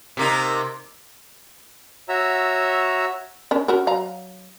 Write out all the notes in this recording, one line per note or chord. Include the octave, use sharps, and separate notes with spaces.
C3 A#3 D#4
F#4 C#5 E5 A#5 E6
C#4 D4 A#4
C#4 F#4 A#4
F#3 F5 A#5